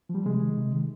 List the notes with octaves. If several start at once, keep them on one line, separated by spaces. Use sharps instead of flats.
F3
G3
C3 G#3
D#3
C3
D#3